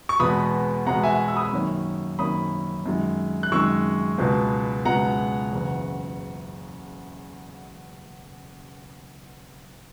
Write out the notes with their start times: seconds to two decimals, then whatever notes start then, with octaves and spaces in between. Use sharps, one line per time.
0.09 C#6
0.20 E2 B2 G#3 B3 B5 D#6
0.86 E2 B2 G#3 B3 F#5 A#5
1.03 E5 G#5
1.28 E6
1.36 B5 D#6
1.53 F#2 D#3 A#3 C#4
2.19 F#2 D#3 A#3 C#4 B5 D#6
2.86 F#2 D#3 G#3
3.43 F#6
3.52 F#2 D#3 G#3 C#6 E6
4.18 C#2 B2 G#3 B3
4.85 C#2 B2 G#3 B3 F#5 A#5
5.52 F#1 E2 C#3